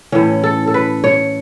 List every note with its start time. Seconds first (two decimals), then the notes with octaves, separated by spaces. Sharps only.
0.12 A2 E3 C#4
0.44 A4
0.67 A4
0.74 B4
1.04 C#5